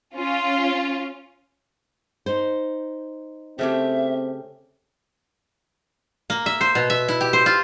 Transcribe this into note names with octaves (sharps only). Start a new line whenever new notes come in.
C#4 F4
D#4 C5
C#3 A3 C4 G4 E5
A#3
E5
C5
B2
E5
E4
G4
C5
F4